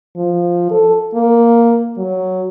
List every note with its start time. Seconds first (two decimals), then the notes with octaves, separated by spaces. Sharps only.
0.16 F3
0.71 A4
1.14 A#3
1.97 F#3